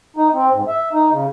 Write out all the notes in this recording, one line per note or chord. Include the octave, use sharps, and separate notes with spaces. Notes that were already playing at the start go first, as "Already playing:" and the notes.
D#4
C4
G#2
E5
D#4
C#3